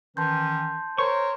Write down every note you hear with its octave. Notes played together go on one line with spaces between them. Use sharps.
D#3 E3 C#4 A5 C6 G6
A#4 C5 C#5 C#6